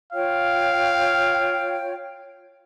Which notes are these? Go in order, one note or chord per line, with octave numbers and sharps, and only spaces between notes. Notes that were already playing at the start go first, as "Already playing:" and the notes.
F4 C#5 F5 G5